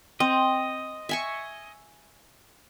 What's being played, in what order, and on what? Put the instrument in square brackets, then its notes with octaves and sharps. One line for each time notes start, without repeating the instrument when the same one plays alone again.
[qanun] C4 [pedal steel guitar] D#5
[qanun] E5 G#5 C#6